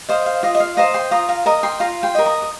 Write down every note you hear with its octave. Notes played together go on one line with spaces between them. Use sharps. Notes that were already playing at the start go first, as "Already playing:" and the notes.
C5 D#5 F5
F5
F4 D#5
D#5
F5
C5 D#5 F5 A#5
G5 C6
F4 A#5 D#6
F5 A#5
A#4 D#5 A#5 D#6
G5 C6
F4 F5 A#5
G5 C6
A#4 D#5
A#5 D#6
D#6